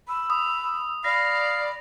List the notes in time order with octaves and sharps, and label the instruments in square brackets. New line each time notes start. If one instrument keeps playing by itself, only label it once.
[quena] B5 [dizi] E6
[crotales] D#6
[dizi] D5 [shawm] F5 [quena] B5 [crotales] A#6